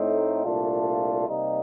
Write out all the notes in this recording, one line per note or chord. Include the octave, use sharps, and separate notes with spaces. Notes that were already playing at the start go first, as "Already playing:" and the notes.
Already playing: A2 A3 C4 D#4
C2 A#2 A3 D4 F4
C3 G3 A#3 D#4